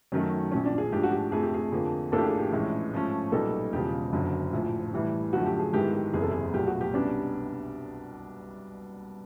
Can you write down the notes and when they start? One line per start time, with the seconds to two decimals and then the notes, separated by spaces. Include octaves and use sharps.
0.12 F#2 D#3 F#3 A3 C#4
0.51 A#1 A#2 F3 C#4
0.66 D4
0.78 G#4
0.92 G#2 F3 A3 D4 G4
1.03 F#4
1.12 G4
1.32 F2 C3 F3 A3 G#4
1.43 G4
1.54 G#4
1.72 F2 D3 F3 A#3
2.12 A1 A2 F3 A#3 D4 A4
2.18 G4
2.26 G#4
2.39 G4
2.52 A#1 A2 E3 G#3 C#4
2.93 G#2 F3 A3 C#4
3.32 B1 A#2 G3 B3 D#4 A4
3.72 E1 E2 C#3 F3 G#3 G4
4.13 F#1 F#2 D3 F#3
4.52 A#1 A2 F3
4.93 A2 E3 G3
5.33 F#2 D3 F3 A3 F#4
5.46 G4
5.60 G#4
5.73 G#2 D#3 G#3 B3 E4 G4
5.93 G4
6.14 F#1 E2 C3 G#4
6.22 A4
6.31 G#4
6.53 B1 A#2 F3 A3 G4
6.66 F#4
6.81 G4
6.94 C2 B2 G3 B3 C#4 D4